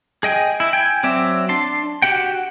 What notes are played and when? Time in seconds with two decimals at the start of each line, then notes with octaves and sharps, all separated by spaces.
0.23 G#4 D#5 G5 G#5
0.60 E4
0.73 G5 G#5
1.03 F#3 C4 D5 E5
1.49 D4 A5 C6
2.02 F#4 G4 F#5 G5